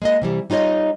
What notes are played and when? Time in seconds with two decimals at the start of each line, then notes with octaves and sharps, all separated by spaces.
0.02 G#3 A#3 D#5
0.22 C3 E3 G3
0.50 G3 D#4 F4 C#5 D#5